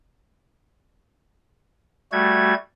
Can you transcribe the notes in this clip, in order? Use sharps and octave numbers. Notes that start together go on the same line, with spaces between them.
G3 A3 F#4 G#6